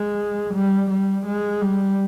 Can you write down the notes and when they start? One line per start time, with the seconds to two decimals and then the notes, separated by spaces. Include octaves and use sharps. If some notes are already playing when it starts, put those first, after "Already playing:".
Already playing: G#3
0.54 G3
0.90 G3
1.26 G#3
1.61 G3